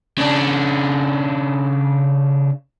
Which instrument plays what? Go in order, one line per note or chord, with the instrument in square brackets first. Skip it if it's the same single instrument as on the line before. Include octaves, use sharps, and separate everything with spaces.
[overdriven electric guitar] C#3 D4